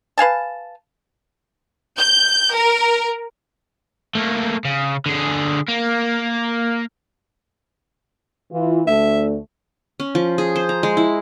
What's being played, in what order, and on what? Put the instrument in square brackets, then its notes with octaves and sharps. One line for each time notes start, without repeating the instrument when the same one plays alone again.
[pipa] B4 F5 G#5 A5
[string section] G6
A#4
[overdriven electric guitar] A3 A#3
C#3
D3 G#4
A#3
[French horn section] E3 F4
[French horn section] D2 A3 D4 [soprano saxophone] E5
[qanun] C#4
F3
G#4
C5
A#5
G#3
E4